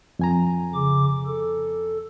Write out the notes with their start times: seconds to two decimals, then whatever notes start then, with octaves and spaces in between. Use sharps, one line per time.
0.19 F2 G#5 A#5
0.74 C#3 D6
1.26 A4